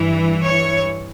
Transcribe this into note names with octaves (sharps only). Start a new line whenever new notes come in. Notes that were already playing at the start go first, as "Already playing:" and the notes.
Already playing: G2 E3
C#5